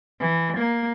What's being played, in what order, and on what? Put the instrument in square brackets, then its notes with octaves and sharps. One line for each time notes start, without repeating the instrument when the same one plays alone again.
[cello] E3
A#3